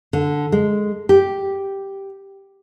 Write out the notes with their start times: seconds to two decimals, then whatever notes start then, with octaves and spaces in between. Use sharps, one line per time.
0.13 D3
0.52 G#3
1.09 G4